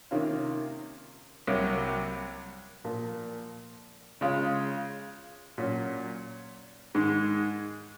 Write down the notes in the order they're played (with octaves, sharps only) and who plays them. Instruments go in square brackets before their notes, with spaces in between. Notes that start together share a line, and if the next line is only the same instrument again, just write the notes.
[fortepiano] C3 D#3 A#3 C#4 F4
C2 C3 F#3 A#3
A#2 F3 A#3
C#3 G#3 C#4 F4
A#2 F#3 C#4
G#2 D#3 G#3